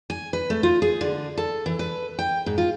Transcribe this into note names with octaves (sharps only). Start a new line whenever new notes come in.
G#5
B4
A3
F4
G#4
D3
A4
E3
B4
G5
G#2
F4